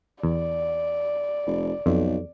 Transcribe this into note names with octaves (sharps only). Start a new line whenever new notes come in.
E2 D5
F1
B1 F2